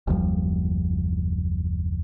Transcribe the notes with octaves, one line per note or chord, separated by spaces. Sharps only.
F#1 D#2 F3 G3